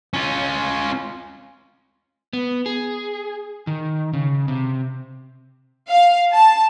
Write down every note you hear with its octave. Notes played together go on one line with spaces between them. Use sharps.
C#4 F4
B3
G#4
D#3
C#3
C3
F5
A5